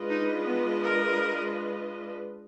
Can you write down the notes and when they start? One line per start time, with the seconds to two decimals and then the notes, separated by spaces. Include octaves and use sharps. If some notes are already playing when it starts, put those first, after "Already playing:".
Already playing: G#3 D4 F4 B4 D#5
0.10 D#4
0.46 B3
0.83 A#4